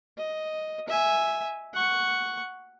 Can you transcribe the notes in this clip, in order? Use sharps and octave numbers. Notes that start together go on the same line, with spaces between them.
D#5
E5 G#5
F#5 C#6